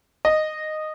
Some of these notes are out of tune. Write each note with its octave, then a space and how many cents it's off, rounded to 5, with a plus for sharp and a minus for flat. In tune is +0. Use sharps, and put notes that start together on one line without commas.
D#5 -10